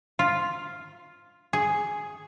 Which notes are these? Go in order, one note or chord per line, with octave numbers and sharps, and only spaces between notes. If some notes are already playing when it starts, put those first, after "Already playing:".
F4
G#4